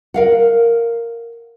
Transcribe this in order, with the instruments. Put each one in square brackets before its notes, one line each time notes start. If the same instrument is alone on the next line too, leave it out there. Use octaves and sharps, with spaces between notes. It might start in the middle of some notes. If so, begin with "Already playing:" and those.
[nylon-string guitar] A#4 F5 F#5